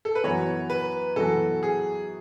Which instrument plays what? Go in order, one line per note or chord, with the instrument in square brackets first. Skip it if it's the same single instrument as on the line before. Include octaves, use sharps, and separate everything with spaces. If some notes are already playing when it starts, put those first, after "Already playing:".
[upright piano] A4
B4
[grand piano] F#2 E3 B3 F#4 [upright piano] C#5
[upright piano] B4
[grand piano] F#2 E3 B3 F#4 [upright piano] A4
[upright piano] G#4